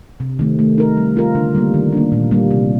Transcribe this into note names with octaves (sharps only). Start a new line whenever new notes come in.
C3
D#3 A3 C4
A3
D#4 A#4
G3
C4 F4 A#4
D3
G3 A#3
D#3
A#3 D4
A#2
G3 A#3
C3